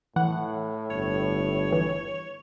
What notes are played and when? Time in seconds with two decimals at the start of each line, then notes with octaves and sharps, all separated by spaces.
0.16 A2 E3 F#5
0.90 G1 C#5
1.72 E3